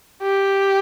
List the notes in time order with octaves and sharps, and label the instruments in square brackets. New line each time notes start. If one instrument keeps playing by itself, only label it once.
[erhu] G4